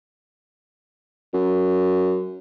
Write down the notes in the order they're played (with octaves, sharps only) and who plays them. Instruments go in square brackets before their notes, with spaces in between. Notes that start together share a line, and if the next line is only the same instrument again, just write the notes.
[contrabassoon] F#2